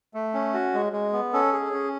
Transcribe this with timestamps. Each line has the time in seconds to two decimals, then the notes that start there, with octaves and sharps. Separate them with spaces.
0.14 A3
0.34 C#4
0.54 F#4
0.74 G#3
0.93 G#3
1.13 B3
1.33 C#4 A4
1.53 G#4
1.73 C#4